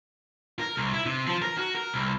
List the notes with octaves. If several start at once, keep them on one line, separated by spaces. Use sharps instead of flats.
A#4
C2
E4
C3
F3
A#4
F#4
A#4
C2